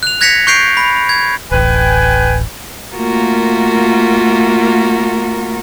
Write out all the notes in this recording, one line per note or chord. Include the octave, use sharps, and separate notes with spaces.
F#6 F7
F#6 G#6 A#6 B6 C#7 F7
C#6 F#6 G6 C7 D7 F7
B5
G#6
D1 A1 B4 G5 G#5
A3 A#3 F4 F#4 A#4